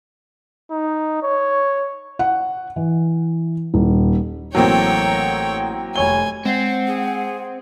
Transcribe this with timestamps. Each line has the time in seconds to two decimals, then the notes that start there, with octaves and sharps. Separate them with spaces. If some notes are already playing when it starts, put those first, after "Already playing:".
0.71 D#4
1.23 C#5
2.19 F#5
2.76 E3
3.74 D#1
4.55 A1 F#3 A3 A#3 C4 C#5 G5
5.96 F1 C#5 G#5 G7
6.46 G#3 C4 C5 F#5
6.87 G#4